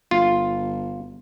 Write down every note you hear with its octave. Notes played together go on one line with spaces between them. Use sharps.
G1 F4